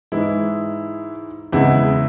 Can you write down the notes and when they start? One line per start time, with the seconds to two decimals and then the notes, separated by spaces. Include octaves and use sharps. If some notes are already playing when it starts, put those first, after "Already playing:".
0.12 G#2 E3 G#3 E4
1.53 E2 C#3 G#3 E4